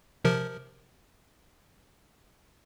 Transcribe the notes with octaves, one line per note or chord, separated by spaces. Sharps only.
C3 F3 A#4